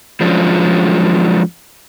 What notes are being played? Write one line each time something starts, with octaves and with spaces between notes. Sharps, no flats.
F3 F#3 G#3 C#4 D4 F4